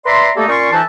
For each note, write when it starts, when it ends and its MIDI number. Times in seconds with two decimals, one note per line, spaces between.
0.06 0.30 71
0.06 0.30 74
0.06 0.30 76
0.06 0.30 82
0.06 0.30 84
0.36 0.45 55
0.36 0.45 57
0.36 0.45 58
0.36 0.45 63
0.36 0.45 69
0.48 0.71 46
0.48 0.71 61
0.48 0.71 74
0.48 0.71 84
0.48 0.71 85
0.72 0.82 41
0.72 0.82 52
0.72 0.82 63
0.72 0.82 76
0.72 0.82 81